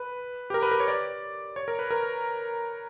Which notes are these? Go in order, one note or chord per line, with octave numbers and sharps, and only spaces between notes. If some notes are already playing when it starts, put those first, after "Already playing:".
Already playing: B4
G4
A#4
B4
A#4
C#5
D5
C#5
A#4
B4
A#4